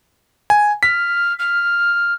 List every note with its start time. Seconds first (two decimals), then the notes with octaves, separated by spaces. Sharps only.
0.50 G#5
0.83 F6 B6
1.39 F6